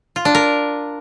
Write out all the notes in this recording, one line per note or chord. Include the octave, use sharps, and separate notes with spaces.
F4
D4
A#4